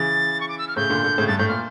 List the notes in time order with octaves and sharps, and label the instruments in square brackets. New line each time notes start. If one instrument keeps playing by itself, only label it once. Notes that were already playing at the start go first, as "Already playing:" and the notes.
Already playing: [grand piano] C#3 E3 [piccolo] A6
[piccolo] C#6
D6
E6
F6
[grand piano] A2 C#3 [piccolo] G6
[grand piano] A#2 D3
A#2 D3
A2 C#3
[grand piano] G2 [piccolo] A6
[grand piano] A2 [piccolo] G6
[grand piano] A#2 [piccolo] F6